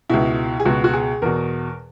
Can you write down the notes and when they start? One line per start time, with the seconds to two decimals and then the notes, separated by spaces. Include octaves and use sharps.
0.10 C#2 B2 E4
0.60 G#4
0.65 C#2 B2 F#4
0.84 F#4
0.93 G#4
1.22 E2 B2 A#4